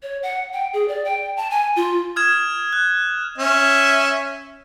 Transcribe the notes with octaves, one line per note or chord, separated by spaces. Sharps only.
C#5
F#5
G5
G#4
D5
G5
A5
G#5
F4
D#6 F6 G#6 E7
F#6
C#4 E5